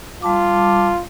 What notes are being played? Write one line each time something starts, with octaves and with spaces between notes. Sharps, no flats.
G3 F4 A5 D6